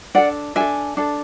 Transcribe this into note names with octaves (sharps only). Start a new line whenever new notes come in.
D4 A4 D5 F#5
D4 A4 E5 G#5
D4 A4